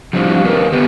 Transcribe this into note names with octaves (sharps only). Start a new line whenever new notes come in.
F3 G3 C4 D4 E4 F#4
D#3 A#3 C4 D#4 A#4 B4
B3 G4 A4 B4